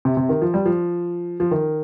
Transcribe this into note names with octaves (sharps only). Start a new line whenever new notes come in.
C3
C3
D#3
F3
G3
F3
F3
D#3